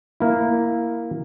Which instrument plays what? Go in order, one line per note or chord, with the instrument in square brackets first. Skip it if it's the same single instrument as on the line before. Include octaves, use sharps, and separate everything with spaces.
[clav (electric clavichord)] A#3 E4